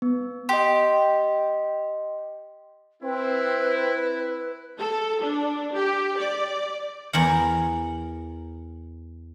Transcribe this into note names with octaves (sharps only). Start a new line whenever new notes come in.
B3
G4 D#5 G5 C6
C4 E4 B4
A4
D4
G4
D5
E2 A#4 F#5